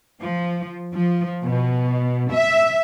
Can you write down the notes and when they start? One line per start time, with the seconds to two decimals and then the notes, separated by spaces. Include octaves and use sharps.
0.21 F3
0.93 F3
1.45 B2
2.32 E5